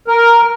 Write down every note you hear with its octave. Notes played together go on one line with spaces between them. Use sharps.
A#4